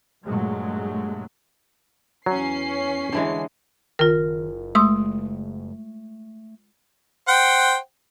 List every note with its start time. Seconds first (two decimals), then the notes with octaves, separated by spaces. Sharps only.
0.25 G2 A#2 F#3 G#3 A3
2.26 E2 F#3 C#4 C7
3.12 D3 E3 G#3
3.99 F#1 D#3 F4 A#4
4.75 G#3 A3 C6 D#6
7.28 C5 F#5 G5